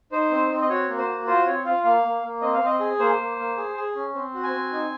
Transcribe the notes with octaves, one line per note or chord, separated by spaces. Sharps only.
D#4 C5
C4
C4
D#5
F#4 C#5
A#3
C5
F#4
F4 C5
C4 C#5
F4 F5
A#3 F5
A#3
A#3
C4 D#5
F5
C4 D#5
G#4
A#3 C5
A#3
A#3
G#4
G#4
C#4
C4
F#4
G#5
C4
D#4